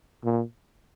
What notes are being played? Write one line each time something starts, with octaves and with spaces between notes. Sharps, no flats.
A#2